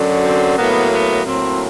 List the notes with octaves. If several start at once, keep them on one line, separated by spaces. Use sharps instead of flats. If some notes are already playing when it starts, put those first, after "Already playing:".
Already playing: F#2 D3 F#3
C4
A2 F#3 A#3 B3
B3
A2 F#3 A#3 C4